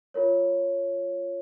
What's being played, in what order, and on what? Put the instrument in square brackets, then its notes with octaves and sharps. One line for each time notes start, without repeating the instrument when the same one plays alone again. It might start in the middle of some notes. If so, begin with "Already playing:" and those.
[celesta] F4 A#4 C#5